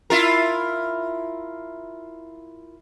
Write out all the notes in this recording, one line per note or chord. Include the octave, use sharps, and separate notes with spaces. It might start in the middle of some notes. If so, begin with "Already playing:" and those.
E4 F4 A#4